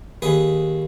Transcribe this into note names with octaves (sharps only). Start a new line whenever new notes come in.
D#2 G#4 B4